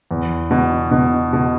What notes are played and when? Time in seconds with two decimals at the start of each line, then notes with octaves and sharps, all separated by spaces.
0.11 E2
0.51 B2
0.91 B2
1.33 B2